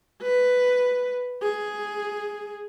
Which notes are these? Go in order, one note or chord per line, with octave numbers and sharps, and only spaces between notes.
B4
G#4